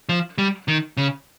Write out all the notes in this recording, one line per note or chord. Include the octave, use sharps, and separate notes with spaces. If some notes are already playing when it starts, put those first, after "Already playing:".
F3
G3
D#3
C#3